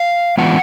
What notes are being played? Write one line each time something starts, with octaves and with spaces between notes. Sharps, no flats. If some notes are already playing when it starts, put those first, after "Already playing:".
Already playing: F5
E3 G#3 B3 D4 F4 F#5